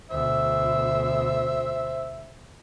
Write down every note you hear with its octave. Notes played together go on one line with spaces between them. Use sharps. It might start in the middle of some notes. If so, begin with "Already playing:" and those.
D2 B2 C5 E5